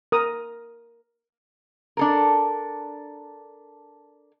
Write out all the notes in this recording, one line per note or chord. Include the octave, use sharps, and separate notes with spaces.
A#4 D#6
D4 A4 A#4